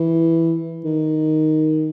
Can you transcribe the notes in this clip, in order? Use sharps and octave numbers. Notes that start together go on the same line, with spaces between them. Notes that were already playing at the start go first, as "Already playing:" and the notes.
Already playing: E3
D#3